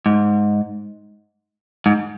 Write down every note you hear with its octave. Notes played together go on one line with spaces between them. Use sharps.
G#2
G#2